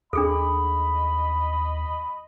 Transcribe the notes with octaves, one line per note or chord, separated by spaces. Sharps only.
D#2 D4 G#4 A4 D#5 B5